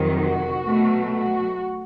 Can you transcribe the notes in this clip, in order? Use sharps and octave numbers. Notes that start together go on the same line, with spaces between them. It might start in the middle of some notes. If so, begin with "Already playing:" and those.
Already playing: F2 C3 D#3 F#3
F#4
B2 F#3 A3
F#4